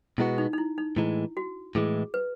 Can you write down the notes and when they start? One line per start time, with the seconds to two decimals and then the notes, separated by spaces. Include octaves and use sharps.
0.18 B2 G#3 B3 E4 F#4
0.38 D#4
0.53 D#4
0.58 E4
0.78 D#4
0.97 A2 E3 G#3 E4
1.37 F#4
1.75 A2 E3 G#3 G#4
2.14 B4